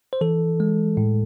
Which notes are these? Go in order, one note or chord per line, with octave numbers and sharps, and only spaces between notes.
C5
E3 A4
G#3
A2